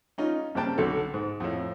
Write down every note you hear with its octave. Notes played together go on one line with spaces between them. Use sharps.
C#4 D#4 F4
G2 C#3 A#3 C4 G5 A5
B1 D3 F#4 A4
G#2
F2 A2